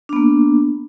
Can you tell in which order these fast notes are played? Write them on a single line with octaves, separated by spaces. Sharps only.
D4 B3 A#3